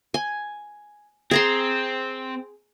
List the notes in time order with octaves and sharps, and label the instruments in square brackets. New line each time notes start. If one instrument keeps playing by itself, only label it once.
[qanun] G#5
[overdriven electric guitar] C4 [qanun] G#4 A#5 C6